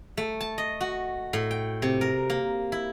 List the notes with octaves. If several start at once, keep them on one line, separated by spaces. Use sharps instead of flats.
A3
A5
D#5
F#4
A2
G5
C3
A#4
A#3
E4